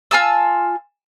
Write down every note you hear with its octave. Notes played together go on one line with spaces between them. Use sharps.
F4 G#5 A5 E6